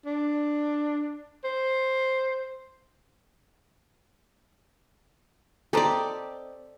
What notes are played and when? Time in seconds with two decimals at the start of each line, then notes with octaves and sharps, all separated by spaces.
0.06 D4
1.44 C5
5.73 C4 D#4 G4 A4 D5